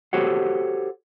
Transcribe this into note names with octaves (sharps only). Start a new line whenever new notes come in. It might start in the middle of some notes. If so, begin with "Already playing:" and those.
F#4 G4 A4 C5 C#5 F#5